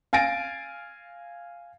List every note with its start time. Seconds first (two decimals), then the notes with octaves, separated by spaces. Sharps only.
0.13 F5 G#5 A6 A#6 D7